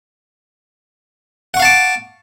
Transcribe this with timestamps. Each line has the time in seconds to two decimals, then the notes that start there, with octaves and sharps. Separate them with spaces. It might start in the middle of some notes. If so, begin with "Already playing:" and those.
1.54 F#5
1.57 C#6
1.60 F5
1.62 A5
1.65 D6